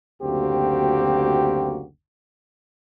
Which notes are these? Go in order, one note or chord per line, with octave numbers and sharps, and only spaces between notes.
F#1 D2 A#3 C4 F#4 G4